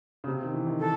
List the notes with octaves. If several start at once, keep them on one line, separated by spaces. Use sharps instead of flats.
C#3
C3
D#3
E3
D#3
E3 A4